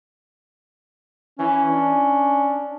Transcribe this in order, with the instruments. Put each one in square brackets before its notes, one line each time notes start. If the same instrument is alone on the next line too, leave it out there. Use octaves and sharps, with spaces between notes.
[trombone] E3 [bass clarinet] C#4
[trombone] D4